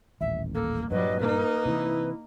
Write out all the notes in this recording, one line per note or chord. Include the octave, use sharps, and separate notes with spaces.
D#1 A1 E5
A#3 A4
G2 A#2 F#3 G3 B4 D#5
A#3 D#4 A#4
C3 E3 E4